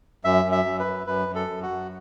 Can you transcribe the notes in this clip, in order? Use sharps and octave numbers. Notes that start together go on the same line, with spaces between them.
F#2 E5
F#2
E5
F#2
B4
F#2
F#2 B4
F#2
A4
F#2
F#4
F#2